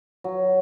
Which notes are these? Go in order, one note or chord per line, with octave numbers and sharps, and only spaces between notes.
F#3